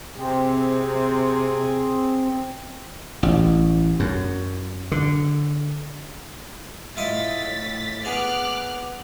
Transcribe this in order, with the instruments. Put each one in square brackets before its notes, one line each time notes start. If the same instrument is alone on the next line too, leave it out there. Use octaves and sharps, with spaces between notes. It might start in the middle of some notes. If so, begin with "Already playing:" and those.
[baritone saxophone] C3 [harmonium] C4 [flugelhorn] G#4
[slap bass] A1
F#2
D3
[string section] A2 A6 B6 [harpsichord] E4 F4 D#5
[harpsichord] B3 G#4 [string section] D6 F6 F#6